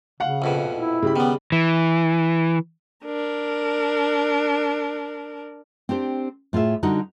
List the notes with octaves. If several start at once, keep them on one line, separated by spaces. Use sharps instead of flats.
C#3 F5 F#5
A#1 F2 B2
E4
C#3 G4 B5
D#3 G3 B3
E3
D4 A#4
C4 D4 G4 C5
A2 F4 G#4 E5
D3 G3 D#4 F#4 D#5 F#5